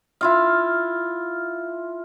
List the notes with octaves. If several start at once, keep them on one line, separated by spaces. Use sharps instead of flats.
E4 F4 F5